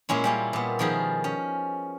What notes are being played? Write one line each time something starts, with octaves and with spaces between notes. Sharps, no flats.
A#2 G#3 C#4 E4
G3 A#3 C#4
A#2 B3
B2 D#3 F3 G3 G#4 A#4
C#4